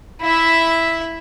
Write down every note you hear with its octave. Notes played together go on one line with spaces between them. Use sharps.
E4 E5